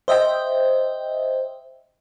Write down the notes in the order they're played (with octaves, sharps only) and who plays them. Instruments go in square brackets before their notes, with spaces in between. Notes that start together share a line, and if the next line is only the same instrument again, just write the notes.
[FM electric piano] C5 D#5 E5 G5